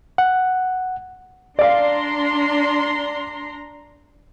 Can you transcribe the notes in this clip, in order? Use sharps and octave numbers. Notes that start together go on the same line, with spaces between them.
F#5
D4 D5 F5 A#5 C6